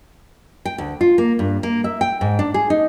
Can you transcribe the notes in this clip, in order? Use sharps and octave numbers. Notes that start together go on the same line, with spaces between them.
G5
D2
F4
A#3
G2
A#3
E5
G5
G#2
D4
G#4
D#4